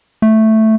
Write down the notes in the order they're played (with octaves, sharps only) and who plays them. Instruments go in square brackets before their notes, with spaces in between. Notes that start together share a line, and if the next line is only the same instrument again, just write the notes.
[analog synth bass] A3